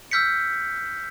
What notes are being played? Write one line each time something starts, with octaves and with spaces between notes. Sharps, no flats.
E6 F6 G6 B6 C#7